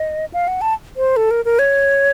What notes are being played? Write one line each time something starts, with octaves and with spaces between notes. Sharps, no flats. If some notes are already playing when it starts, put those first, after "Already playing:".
Already playing: D#5
F5
F#5
A5
C5
A4
A#4
A#4
C#5